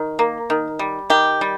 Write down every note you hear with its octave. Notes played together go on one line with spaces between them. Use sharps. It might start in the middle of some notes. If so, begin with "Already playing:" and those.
Already playing: D#3
A#3
D#3
G3
D#3 G4
G3